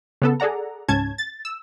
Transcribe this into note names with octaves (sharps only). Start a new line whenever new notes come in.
C#3 B3 A4
G#4 A4 D5 F#5 A#5
C#2 G#2 C#4 A5 G#6
A6
E6